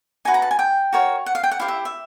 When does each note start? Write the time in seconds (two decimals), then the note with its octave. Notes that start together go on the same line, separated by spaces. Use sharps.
0.25 D#4 F#4 B4 G#5
0.34 A#5
0.42 A5
0.51 G#5
0.59 G5
0.93 F#4 A#4 C#5
1.26 F#5
1.35 F5
1.43 G5
1.51 F#5
1.59 E4 G4 C5 F5
1.68 E5
1.85 E5